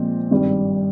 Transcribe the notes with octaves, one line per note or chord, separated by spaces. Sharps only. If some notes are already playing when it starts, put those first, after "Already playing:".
Already playing: A#2 F3 G#3 C4
G#1 G2 G3